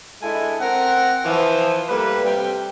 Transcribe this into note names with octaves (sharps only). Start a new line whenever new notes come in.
G#3 D4 E4 A4 G#5
C4 A#4 F#5
E3 F3
G3 A3 A#3 B4
C3 G3 G5